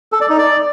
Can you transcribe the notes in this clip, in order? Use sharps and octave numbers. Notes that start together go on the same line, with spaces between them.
A4
D5
D#4
D5